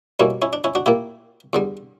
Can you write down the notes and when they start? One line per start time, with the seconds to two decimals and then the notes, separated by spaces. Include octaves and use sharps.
0.20 B2 G3 A#3 C#4 E4
0.42 C#4 E4
0.53 D4
0.64 C#4 E4
0.75 D4 F#4
0.86 A#2 A#3 E4 G4
1.53 E2 D3 G3